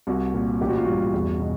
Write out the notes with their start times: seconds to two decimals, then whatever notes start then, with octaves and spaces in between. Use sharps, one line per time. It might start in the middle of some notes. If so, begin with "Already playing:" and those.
0.07 C2 F#4
0.34 A#2
0.61 A1 G4
0.68 F#4
0.77 F4
0.85 G2 F#4
1.13 E2
1.40 B2